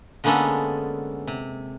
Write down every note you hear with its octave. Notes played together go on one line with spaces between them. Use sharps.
D3 G#3 A#3 B3 C#4 A4
C3